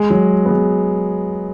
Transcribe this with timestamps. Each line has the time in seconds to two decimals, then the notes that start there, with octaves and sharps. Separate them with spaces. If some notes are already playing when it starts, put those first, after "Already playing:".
Already playing: G#3
0.10 F#3
0.46 B3
0.50 G#3